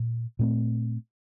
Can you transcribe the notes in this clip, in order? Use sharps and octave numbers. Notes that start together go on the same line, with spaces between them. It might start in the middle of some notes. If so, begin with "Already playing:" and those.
Already playing: A#2
A#2 A3 C4